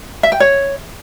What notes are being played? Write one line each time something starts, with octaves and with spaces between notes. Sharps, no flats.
E5
G5
C#5